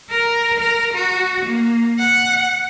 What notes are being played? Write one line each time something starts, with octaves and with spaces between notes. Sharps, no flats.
A#4
A#4
F#4
A#3
F#5